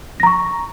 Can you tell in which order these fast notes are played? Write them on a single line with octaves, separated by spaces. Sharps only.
A#6 A#5 C#6